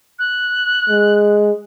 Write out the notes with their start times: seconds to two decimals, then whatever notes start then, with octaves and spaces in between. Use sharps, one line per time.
0.18 F#6
0.89 G#3